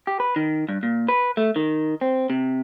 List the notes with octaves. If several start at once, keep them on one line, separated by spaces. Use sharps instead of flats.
G4
B4
D#3
G2
A#2
B4
A3
D#3
C4
C3